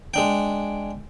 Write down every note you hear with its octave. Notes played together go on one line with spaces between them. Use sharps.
G#3 D4 G5